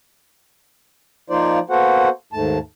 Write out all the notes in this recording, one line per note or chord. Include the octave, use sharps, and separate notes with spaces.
F3 A#3 D#4 F4 C5 D5
A#3 B3 F#4 A4 C5 F#5
D#2 G#2 A3 A5